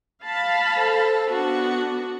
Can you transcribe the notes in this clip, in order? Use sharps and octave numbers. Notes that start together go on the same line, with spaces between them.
F5 A5 B5
A4 C5
B3 D4 F#4